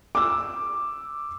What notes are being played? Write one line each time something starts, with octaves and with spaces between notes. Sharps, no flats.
D6 E6